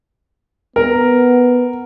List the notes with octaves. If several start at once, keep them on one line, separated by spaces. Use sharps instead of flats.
B3 A#4